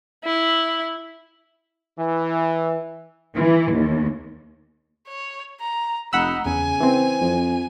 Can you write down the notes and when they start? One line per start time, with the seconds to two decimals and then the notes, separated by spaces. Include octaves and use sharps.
0.24 E4
1.98 E3
3.36 E3
3.72 D#2
5.08 C#5
5.61 A#5
6.13 F1 D#4 F#5 B5 E6
6.45 E2 C#3 G#5
6.80 E3 C4
7.21 F2